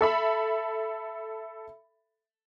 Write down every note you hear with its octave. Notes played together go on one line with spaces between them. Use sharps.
A4 E5 B5